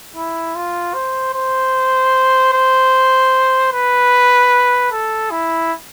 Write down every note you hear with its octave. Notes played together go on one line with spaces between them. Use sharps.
E4
F4
C5
C5
C5
B4
A4
E4